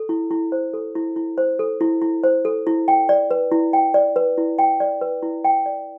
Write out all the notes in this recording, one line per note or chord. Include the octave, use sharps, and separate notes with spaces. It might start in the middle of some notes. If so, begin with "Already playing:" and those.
Already playing: A4
E4
E4
C5
A4
E4
E4
C5
A4
E4
E4
C5
A4
E4
G5
D5
B4
E4
G5
D5
B4
E4
G5
D5
B4
E4
G5
D5